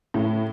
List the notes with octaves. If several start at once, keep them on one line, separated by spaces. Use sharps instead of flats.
A2